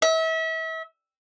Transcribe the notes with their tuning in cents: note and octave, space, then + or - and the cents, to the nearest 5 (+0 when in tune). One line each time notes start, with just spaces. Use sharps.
E5 -35